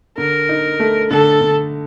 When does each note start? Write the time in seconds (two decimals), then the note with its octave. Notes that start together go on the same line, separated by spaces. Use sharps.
0.18 D3 A#4
0.49 D#4
0.80 A3
1.10 D3 A4
1.41 D3